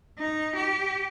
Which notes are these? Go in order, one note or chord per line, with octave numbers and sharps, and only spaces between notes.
D#4
G4